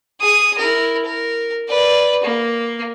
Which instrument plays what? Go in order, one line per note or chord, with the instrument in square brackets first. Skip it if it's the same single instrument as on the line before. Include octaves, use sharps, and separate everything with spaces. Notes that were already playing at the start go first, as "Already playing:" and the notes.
[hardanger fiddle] G#4 D#6
E4 A#4
A#4
B4 D5
A#3